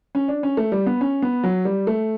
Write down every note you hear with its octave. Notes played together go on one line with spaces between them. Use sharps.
C#4
D4
C#4
A3
G3
B3
C#4
B3
F#3
G3
A3